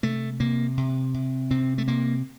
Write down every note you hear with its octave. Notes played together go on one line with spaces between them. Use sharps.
C3 A3
C3 A#3
C3
C3
C3 C4
A3
C3 A#3